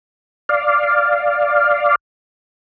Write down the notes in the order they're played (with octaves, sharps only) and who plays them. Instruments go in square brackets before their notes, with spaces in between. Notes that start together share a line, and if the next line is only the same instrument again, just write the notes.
[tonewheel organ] D5 F5